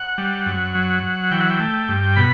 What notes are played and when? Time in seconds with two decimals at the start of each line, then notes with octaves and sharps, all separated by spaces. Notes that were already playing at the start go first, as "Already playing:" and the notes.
Already playing: F#5
0.18 G3
0.46 F#2
0.75 F#3
1.03 F#3
1.31 E3 G5
1.40 F#5
1.50 G5
1.60 A3
1.88 G2
2.16 B2 B5